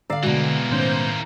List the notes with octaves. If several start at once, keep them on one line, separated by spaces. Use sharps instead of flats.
D3 D5 F5 A#5 E6 C7
B2 E3 G#3 A#3 F#4
A2 D#3 C#4 C5 G6